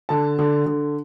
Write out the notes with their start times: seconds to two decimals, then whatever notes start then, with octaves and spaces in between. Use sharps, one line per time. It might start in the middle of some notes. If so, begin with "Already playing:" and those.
0.09 D3 A5
0.39 D3
0.66 D3